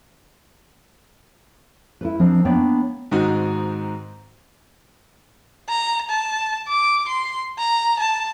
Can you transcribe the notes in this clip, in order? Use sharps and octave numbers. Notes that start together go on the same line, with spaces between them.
E4 A4 B4
F3 C4 D4 A#4
A#3 B3 D4 C#5 D5 G5
G#2 D#3 C4 D#4 F#4
A#5
A5
D6
C6
A#5
A5